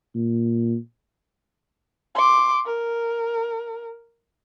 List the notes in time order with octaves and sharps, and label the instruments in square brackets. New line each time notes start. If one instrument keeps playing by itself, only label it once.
[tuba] A#2
[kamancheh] C6 D6
A#4